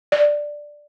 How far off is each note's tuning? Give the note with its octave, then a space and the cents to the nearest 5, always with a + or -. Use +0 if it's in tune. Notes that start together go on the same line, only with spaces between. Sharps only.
D5 +5